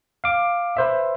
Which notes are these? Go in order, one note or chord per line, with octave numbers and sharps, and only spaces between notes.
F5 D6
B4 C5 E5